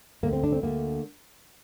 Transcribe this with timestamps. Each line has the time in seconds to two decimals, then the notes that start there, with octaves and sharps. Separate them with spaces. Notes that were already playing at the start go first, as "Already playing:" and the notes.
0.23 D2 D3 A3 A#3
0.33 C4
0.44 D4
0.52 C4
0.63 D2 D3 A3 A#3